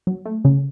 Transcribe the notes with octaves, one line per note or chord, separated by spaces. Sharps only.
F#3
A3
C#3